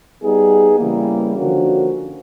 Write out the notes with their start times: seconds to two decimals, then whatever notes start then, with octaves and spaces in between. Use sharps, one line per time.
0.22 G3 B3 D#4 G#4
0.78 C#3 E3 G3 A#3
1.36 D3 F3 A#3 C#4 F#4